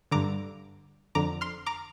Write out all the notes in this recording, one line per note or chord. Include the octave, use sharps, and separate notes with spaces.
G2 D3 A#5 D6
F2 D3 A#5 D6
C6 F6
A#5 D6